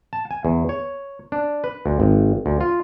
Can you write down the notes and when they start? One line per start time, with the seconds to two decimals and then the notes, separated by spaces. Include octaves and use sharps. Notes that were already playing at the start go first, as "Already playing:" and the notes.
0.13 A5
0.31 G#5
0.45 E2
0.69 C#5
1.32 D4
1.64 B4
1.86 D2
2.00 G#1
2.46 D2
2.61 F4